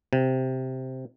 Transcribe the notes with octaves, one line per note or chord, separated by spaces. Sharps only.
C3